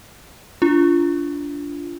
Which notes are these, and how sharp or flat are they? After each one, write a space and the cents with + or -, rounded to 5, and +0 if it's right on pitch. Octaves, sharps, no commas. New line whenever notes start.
D4 -25 F4 -20